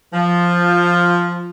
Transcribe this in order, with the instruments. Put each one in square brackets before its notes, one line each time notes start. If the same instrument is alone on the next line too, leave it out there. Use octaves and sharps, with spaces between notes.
[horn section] F3